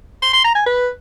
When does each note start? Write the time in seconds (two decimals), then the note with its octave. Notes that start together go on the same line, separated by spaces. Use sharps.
0.22 C6
0.33 C6
0.44 A#5
0.55 G#5
0.66 B4